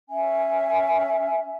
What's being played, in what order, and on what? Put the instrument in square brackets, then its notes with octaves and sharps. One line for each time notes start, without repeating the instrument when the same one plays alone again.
[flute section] C#4 E5 G#5